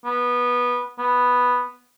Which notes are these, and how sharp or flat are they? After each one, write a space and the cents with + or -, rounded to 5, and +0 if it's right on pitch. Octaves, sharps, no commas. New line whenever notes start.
B3 -15
B3 -5